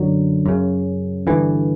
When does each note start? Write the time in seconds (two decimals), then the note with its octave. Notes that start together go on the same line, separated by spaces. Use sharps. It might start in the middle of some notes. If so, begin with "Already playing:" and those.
Already playing: F#2 D3 F#3
0.46 F#2 C#3
1.27 G2 D3 E3